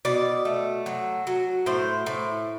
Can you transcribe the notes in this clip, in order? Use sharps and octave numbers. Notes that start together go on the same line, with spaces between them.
B2 D5
A3
F#3
F#3
A2 C5
A2